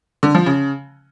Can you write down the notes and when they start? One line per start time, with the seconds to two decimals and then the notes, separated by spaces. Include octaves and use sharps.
0.23 D3
0.35 F3
0.46 C#3